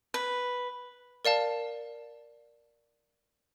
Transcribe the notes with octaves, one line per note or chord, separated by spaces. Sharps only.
B4
A#4 D5 F5 A5